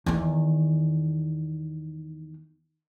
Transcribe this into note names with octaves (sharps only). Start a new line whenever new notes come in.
E2 D#3